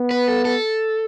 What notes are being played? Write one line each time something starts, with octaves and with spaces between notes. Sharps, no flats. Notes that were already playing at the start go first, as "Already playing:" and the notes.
Already playing: B3
B4
A4
A4